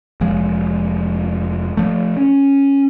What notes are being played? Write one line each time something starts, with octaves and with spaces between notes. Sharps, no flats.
F1 F3 G#3
F3 A3
C#4